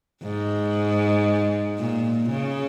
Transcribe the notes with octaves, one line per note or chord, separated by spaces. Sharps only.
G#2
A#2
C#3